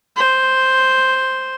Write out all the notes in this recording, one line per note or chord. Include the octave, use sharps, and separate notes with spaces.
C5